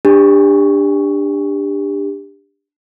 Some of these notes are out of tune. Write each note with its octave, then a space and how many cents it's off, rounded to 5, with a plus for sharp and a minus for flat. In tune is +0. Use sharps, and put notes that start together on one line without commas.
D4 +0 G4 +25